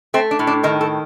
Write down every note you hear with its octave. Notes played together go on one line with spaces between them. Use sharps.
A3 C4
D4
A2
D4
D#3 D#4
A4